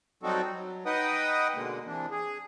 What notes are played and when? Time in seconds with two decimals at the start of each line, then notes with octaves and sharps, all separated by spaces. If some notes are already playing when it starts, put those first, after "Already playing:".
0.23 F#3 G3 C4 D#4 F#4 A4
0.52 F#3
0.86 D#4 B4 D#5 F#5 G5 D#6
1.55 B2 D3 G#3 A#3
1.86 C3 E3 D4
2.11 G#4